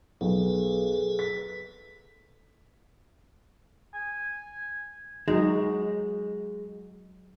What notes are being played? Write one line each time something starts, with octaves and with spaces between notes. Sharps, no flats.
B1 G#4 A4 B4
B6
G#5
F#3 G#3 D#4 F#4